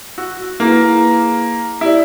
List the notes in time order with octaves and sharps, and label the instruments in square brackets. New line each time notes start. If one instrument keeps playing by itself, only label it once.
[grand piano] F#4 [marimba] E6
[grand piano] A#3 [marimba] E4 G#4 B4
[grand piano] E4 [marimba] G4 D5